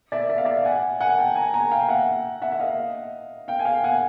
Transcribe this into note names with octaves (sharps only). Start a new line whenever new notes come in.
D5 E5
E5
F5
D5 E5
F#5 G#5
F#5 G#5
G5 A5
G#5 A#5
G#5 A#5
F5 G5
E5 F#5
E5 F#5
E5
D#5 F5
F5 G5
G#5
F5 G5
F#5 G#5